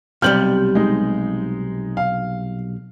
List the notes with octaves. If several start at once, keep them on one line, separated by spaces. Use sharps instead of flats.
B1 C3 G3 F6 G6 F#7
G#3 D#4
F5